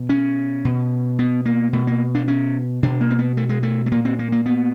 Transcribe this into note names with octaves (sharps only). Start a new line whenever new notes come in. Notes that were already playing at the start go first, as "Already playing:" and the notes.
Already playing: B2
C#4
B2
B3
A#3
B2 A3
A#3
D4
C#4
B2 D4
A#3
C4
B3
A3
G#3
A3
A3
A#2 A#3
C4
A#3
A#3
B3